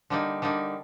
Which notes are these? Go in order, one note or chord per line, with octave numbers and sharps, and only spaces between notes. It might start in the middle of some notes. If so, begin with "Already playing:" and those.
D3 G3 A#3 D#4
D3 G3 A#3 D#4